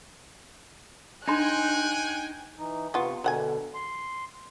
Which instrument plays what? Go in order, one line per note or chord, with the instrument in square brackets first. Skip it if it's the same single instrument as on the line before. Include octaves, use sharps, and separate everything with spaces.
[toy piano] D4 C6 [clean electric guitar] D#4 [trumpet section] G5 G#5 [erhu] F#6
[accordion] E3 D#4
[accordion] C3 C#6 [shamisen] B3 F4
[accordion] B2 D3 [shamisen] F#3 F#5 G#5
[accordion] C6